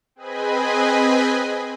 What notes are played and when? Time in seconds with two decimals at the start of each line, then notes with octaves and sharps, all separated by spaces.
0.16 C4 G#4 B4 D#5 G#5 B5